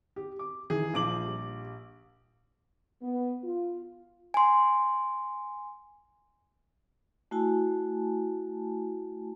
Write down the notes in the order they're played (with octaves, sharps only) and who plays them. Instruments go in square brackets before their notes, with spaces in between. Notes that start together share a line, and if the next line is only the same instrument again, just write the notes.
[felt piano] G4
D6
[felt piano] D#3 E3 [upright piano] G#4
[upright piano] A#1 D6 F#7 [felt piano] F3
[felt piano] G3
[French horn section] B3
F4
[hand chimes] G#5 C6
[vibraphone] A3 E4 F#4 G#5 A5